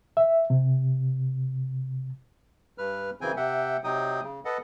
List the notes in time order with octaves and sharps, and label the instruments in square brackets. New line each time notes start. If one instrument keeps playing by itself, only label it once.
[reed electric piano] E5
C3
[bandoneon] G2 B4 F6
F#2 C#3 E3 C4 G5 G#5
C3 E5 F#5 G5
C3 F#3 D#4 G5 D#6
C#3
A4 B4 D#5 F#5